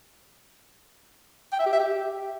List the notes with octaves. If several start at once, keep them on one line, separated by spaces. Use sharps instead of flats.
G5
E5
G4
E5
G4